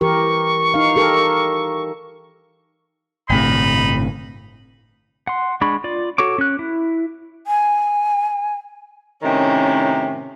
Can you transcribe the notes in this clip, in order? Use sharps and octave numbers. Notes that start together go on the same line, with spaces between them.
E3 G4 A#4 C#6
D#4 F5
G4 A4 A#4
G1 A2 C3 D#4 B5
F#5 C6
G#3 D4 B5 C#6
F4 D5
F#4 A4 C#5 C#6 D6
C#4 F#6
E4
G#5
A2 C3 D#3 C#4